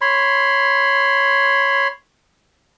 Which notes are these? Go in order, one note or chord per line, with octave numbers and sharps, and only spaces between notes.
C#5 B5 C6